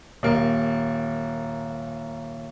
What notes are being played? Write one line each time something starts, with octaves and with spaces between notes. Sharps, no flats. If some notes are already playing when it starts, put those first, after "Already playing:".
D#1 A#3